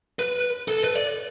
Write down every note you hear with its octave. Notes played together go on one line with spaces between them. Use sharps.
B4
A4
B4
D5